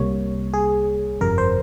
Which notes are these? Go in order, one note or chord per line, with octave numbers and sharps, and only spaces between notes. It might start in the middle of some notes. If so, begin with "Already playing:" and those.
Already playing: C2 C3 G3 A#3 C#5
G#4
G1 F2 C3 A#4
C5